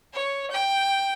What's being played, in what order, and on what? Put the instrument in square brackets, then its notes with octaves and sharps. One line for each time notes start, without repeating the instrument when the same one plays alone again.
[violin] C#5
G5